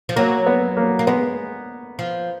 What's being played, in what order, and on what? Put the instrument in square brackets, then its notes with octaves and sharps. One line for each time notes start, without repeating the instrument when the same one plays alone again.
[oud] F3
[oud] F#3 [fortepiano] A#3
[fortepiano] B3
A#3
[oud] A#3
[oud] G#3 [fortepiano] B3
[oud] F3